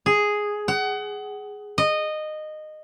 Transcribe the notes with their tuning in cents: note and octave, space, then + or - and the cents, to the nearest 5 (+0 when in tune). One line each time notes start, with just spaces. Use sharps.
G#4 +0
F#5 +30
D#5 -15